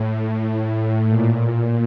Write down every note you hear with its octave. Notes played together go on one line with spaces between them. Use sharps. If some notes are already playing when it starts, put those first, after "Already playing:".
Already playing: A2
A#2